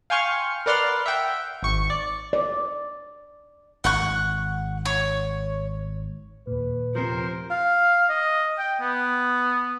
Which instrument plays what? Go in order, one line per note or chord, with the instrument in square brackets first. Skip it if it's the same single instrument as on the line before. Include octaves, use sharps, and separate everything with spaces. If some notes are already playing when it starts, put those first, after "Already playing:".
[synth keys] F5 G5 G#5 C6 C#6 F6
A#4 B4 D5 F#5 C6 F6
E5 F#5 G5
G#1 C#6 C#7
D5
[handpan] D5
[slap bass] G#1 [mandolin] F#5 C#6 F#6
[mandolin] C#5
[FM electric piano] D#2 A#2 [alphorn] B4
[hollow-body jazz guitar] C3 F3 [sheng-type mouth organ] A#4 C5
[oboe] F5
D#5
G5
B3